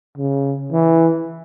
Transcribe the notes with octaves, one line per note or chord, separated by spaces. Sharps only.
C#3
E3